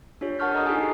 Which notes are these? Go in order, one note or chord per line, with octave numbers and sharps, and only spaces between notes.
D4 F4 G4 C#5
A#4 F#5 A5 C#6 F6 G6
A4 D#5 A#5 D#6
D#4 F4 G4 G#4 G#5 A5
E4 F#4 C7